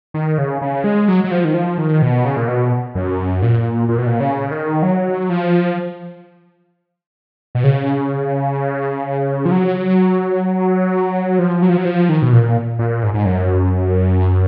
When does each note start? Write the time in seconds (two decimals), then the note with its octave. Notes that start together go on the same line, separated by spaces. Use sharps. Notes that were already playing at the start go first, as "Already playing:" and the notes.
0.14 D#3
0.38 C#3
0.62 C#3
0.84 G#3
1.08 F#3
1.24 F#3
1.31 F3
1.45 D#3
1.54 F3
1.78 D#3
2.02 B2
2.25 C#3
2.37 A#2
2.48 B2
2.95 F#2
3.42 A#2
3.89 A#2
3.98 B2
4.06 A#2
4.20 C#3
4.51 D#3
4.83 F#3
5.29 F3
7.55 B2
7.64 C#3
9.45 F3
9.51 F#3
11.39 F3
11.62 F#3
11.69 F3
11.78 F#3
11.85 F3
12.09 D#3
12.22 B2
12.33 A#2
12.79 A#2
13.03 G#2
13.14 G#2
13.25 F#2